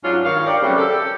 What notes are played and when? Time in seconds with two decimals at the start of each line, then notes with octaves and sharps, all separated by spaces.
0.04 G#2 F#3 C#4 D4 F4
0.24 G2 D#3 C#5 F5
0.46 G4 A#4 C#5 D5
0.61 C#3 F#3 G3 A3 C4
0.78 G4 A4